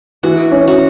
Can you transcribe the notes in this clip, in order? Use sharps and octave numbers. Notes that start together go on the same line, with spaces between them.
E3 F#4
C#4
F#4